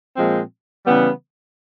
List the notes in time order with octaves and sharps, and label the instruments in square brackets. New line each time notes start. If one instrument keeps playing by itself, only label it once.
[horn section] A#2 F3 G#3 C4
C#3 E3 G3 B3